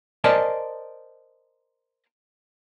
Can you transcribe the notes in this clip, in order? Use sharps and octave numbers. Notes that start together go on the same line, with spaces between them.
A#4 C5 D5 D#5 G#5 A5